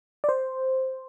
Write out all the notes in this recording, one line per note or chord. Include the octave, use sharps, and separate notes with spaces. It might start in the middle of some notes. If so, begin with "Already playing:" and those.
D5
C5